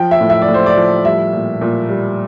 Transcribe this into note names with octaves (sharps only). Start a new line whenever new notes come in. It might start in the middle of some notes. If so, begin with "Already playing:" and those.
Already playing: F3 G5
E5
A2
E5
D5
A2
C5
D5
F3
G3 E5
A#2
A#2
G3